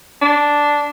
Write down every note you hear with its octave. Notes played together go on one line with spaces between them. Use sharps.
D4